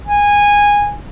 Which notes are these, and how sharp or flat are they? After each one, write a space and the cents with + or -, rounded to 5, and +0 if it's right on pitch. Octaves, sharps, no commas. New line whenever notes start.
G#5 -15